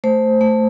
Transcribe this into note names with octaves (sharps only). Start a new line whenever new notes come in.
A3 C5
A3